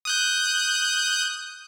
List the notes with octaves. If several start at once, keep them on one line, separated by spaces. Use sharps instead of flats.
D#6 F#6 G6